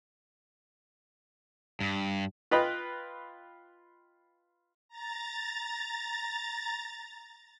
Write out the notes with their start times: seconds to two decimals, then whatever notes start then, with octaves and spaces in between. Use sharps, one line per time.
1.81 G2
2.51 F4 B4 D#5 G5 B5
4.88 A#5 A6